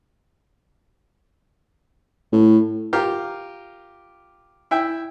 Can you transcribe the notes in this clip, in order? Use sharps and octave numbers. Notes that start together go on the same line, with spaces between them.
A2
F4 G4 A#4 F5
E4 E5 G5